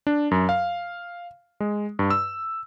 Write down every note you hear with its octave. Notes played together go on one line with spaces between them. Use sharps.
D4
F#2
F5
G#3
G2
E6